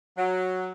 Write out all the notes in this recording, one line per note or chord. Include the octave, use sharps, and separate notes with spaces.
F#3